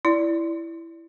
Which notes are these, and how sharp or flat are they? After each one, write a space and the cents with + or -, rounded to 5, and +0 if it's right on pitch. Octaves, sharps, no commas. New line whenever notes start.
E4 +10 D5 -10